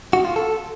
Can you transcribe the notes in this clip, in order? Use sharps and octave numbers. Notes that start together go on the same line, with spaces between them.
F#4
F4
A4